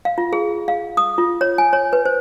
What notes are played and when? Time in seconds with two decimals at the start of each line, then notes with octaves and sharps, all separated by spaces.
0.05 F5
0.18 F4
0.33 G#4
0.68 F5
0.97 D#6
1.18 F4
1.41 C#5
1.58 G#5
1.73 C#5
1.93 B4
2.05 C5